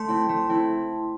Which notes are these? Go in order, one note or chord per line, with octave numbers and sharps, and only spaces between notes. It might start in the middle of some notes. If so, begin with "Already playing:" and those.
Already playing: A3 A5 C6
C4 E4
A3
C4 E4